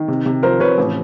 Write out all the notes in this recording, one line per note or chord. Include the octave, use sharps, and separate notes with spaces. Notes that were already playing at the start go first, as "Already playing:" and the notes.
Already playing: D#3
C3
C3
F3 A#4 C5
C3 B4 C#5
A1